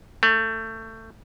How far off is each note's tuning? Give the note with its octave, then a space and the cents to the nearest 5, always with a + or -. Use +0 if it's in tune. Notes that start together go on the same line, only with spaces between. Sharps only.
A3 +20